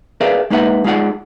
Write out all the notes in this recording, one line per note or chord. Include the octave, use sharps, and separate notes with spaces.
G#4 A#4 B4 D5 E5 F5
G#3 A#3 D#4 B4 E5 F#5
G#3 D#4 F4 G#4 D5 F#5